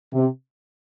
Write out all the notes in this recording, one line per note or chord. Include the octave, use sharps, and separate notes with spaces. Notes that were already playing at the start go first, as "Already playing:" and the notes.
C3